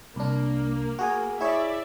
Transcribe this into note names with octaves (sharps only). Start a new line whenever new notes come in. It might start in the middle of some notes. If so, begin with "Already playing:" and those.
C2 A#3 D4
F#4 G#4 G#5
E4 G#4 C#5 D5 E5